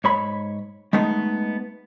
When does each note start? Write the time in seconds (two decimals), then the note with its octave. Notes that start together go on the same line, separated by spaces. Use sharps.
0.04 G#2 C#5 B5
0.93 G#3 A3 B3 D#4